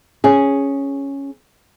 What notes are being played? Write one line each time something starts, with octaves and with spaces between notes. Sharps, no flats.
C#4 G#4